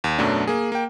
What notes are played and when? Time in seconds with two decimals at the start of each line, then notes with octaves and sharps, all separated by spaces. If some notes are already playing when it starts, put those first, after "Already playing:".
0.04 D#2
0.19 F#2 B2 F#3 A3 D4
0.47 A#3 G#4
0.72 A#3 G5